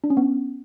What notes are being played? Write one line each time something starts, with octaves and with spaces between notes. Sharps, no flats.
D4
C#4
B3